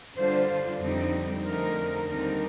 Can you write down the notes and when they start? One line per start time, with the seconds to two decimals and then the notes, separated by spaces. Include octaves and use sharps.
0.17 D3 G3 D4 F4 C5
0.49 C5
0.80 F2 D3 G3 C4 D#4
1.44 F2 D3 A3 C4 D#4 A#4
2.08 D#2 D3 G3 C4 D#4 A#4